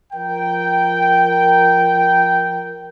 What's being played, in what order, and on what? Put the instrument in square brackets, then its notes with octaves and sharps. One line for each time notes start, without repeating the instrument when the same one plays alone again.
[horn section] F3 A#4 G5